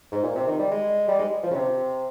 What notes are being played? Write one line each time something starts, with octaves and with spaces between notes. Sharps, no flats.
G#2
A#2
C3
D#3
G3
G#3
G3
G#3
F3
C#3
C3